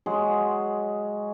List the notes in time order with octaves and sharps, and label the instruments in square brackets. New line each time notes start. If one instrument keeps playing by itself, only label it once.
[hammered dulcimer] F#3 G#3 G#4